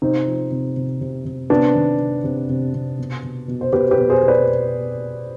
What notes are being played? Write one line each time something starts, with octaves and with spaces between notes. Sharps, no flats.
C3 C4 D#4
F3
C3
C3
C3
C3
C3 B3 D4
D#3
C3
C3
C3
C3
B2
B2
B2
C5
B2 G4 B4
G4 B4
B2
G#4 C5
B2
B4 D5